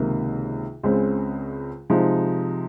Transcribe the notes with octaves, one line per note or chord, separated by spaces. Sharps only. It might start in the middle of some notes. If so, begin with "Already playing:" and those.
Already playing: C#2 C3 D#3 A#3
C#2 C#3 G#3 C4
C3 F3 G#3 D#4